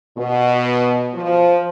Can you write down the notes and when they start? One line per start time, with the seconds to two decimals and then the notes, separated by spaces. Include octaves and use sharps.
0.17 B2
1.14 F3